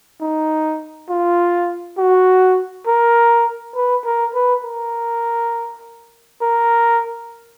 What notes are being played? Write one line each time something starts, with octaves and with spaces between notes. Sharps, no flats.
D#4
F4
F#4
A#4
B4
A#4
B4
A#4
A#4